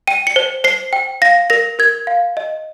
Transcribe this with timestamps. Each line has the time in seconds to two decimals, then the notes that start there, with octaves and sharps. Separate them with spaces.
0.07 G5 D#7
0.27 C#7
0.36 C5
0.64 C5 C7
0.93 G5
1.22 F5 A#6
1.50 A#4 A#6
1.79 A#4 G#6
2.07 F5
2.37 D#5